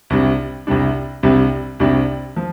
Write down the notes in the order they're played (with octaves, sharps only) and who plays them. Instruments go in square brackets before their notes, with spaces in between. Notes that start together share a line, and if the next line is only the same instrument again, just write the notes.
[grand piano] C2 C3 G3 D4
C2 C3 G3 D4
C2 C3 G3 D4
C2 C3 G3 D4
F3